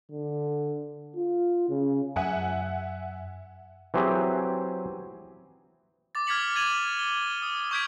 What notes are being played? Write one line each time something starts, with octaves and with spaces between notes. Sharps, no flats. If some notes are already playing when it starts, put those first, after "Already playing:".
D3
F4
C#3
F#2 E5 F#5 G#5
E3 F#3 C4 G4 G#4
D6 A6
F6 G#6 A6 B6 C#7 F#7
G#6 A6 D#7 F7 F#7
G7
D#6
C#6 D#6 G6 G#6 B6 D7